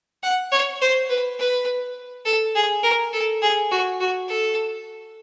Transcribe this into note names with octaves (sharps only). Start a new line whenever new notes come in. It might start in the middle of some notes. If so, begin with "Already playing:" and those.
F#5
C#5
C5
B4
B4
A4
G#4
A#4
A4
G#4
F#4
F#4
A4